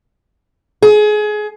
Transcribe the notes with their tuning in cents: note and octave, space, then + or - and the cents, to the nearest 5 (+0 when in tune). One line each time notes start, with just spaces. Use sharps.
G#4 +25